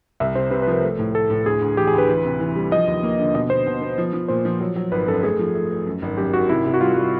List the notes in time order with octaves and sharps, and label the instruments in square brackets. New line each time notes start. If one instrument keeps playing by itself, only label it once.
[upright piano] C2 [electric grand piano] E5
[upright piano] C3 [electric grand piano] C5
[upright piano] C3 [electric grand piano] B4
[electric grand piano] B4
[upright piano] F3 [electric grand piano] A#4
[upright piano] A3
A2
[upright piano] A3 [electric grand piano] A4
[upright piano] A2
[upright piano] D2 [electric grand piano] G#4
[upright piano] D2
[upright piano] E3 [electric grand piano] G4
[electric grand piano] G#4
[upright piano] D2
[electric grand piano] B4
[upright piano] E3
C3
E3
G3
[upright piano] F3 [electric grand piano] D#5
[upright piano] D#2
A#3
D3
[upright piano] B2 [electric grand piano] D#5
[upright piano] B3 [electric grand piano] C5
[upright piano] B2
B3
F3
F3
[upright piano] A#2 [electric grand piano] C5
[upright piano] F3
F#3
F#3
[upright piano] G#1 [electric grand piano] B4
[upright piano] F#2 [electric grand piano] A4
[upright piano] A3 [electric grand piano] G#4
[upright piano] F3
A3
A3
F#2
G#1
[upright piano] F#2 [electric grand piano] G4
[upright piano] G#1 [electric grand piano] F#4
[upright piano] C3 [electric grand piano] E4
[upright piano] C3
[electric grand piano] F#4
[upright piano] G3 [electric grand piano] F4
[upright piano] G3